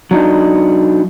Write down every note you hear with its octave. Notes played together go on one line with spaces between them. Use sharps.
F#3 D4 D#4